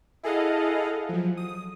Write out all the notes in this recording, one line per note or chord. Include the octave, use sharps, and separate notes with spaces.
E4 G#4 A4 D#5 F5 F#5
F3 F#3
D#6